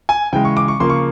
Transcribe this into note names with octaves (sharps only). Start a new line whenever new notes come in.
G#5
C#3 E3 G#3 G5
C#6
D6
C#6
C#3 F3 A#3 C6
C#6